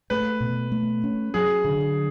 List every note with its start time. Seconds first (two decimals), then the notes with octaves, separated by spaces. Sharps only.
0.10 A3 B4
0.40 B2
0.72 A3
1.04 C#4
1.34 F#3 G#4
1.65 D3